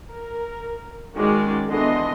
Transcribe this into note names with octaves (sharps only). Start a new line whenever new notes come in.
A#4
D#3 G#3 C#4 F#4 D5
D3 E3 B3 D#5 C6